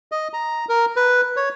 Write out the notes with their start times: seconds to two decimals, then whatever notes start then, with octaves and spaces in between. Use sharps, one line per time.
0.12 D#5
0.33 A#5
0.69 A#4
0.96 B4
1.36 C#5